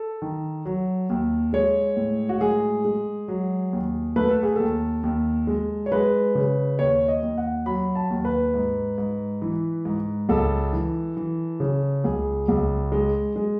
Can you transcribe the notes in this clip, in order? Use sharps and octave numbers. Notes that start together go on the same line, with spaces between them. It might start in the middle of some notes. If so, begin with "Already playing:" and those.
Already playing: A4
D#3
F#3
D#2
G#3 C#5
A2
F#4
G#3 G#4
G#3
F#3
D#2
A3 B4
A4
G#4
D#2 A4
D#2
G#3
C#5
G#3 B4
C#3
D#2 C#5
D#5
D#2
F#5
F#3 B5
A5
D#2
B4
G#2
G#2
E3
G#2
C#2 A4
E3
E3
C#3
C#2 G#4
C#2
G#3
G#3